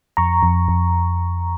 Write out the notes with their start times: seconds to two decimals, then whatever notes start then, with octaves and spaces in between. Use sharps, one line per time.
0.17 F2 A#5 C#6
0.43 F2
0.68 F2